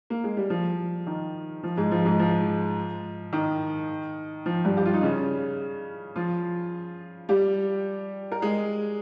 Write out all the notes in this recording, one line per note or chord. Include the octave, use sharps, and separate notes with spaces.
A#3
G#3
G3
F3
D#3
F3
G#2 G#3
F3
G#2 G#3
F3
D#3
F3
G2 G3
G4
F4
D#4
C#3 C#4
F3 F4
G3 G4
A#4
G#3 G#4